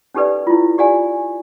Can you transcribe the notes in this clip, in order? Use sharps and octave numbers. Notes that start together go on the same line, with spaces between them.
C#4 D#4 G4 A4 B4 D5
E4 F4
G4 D5 F#5 G#5